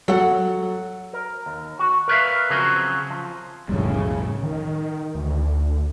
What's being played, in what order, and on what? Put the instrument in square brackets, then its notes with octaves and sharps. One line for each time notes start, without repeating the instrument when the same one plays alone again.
[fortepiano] F#3 [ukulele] A4 F#5
[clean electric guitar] A#4
D#2
F#4
A#4 B4 C#5 E5 F5
C#3 F3 F#3 C4 F#4 G#4
F3
[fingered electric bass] B1 F2 G3 [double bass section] A2 C#3
[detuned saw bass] D#3
D2